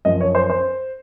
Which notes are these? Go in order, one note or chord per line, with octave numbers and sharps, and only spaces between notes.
F#2 F3 D#5
C#5
C5
C5